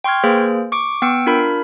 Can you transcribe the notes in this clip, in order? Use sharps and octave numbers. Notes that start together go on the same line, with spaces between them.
G5 C6 C#6 F6 G#6
A#3 G#4 B4 C5
C#6 D6 D7
B3 G5 E6 C#7 D7
D4 F4 A#4 B5